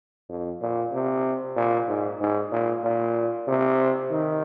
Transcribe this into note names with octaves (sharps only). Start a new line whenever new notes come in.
F2
A#2
C3
A#2
G#2
G#2
A#2
A#2
C3
D#3